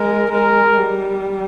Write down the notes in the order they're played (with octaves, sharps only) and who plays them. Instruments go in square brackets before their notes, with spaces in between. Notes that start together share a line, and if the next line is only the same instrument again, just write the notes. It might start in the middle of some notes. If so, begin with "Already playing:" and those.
Already playing: [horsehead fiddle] G#3 [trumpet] A#4
[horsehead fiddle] G#3 [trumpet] A#4
[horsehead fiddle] G3